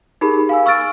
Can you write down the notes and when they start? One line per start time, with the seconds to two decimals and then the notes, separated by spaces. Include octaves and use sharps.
0.21 D#4 G4 G#4 A#4 B5
0.49 F5 G#5 E6
0.66 C#6 E6 F6 A6 D7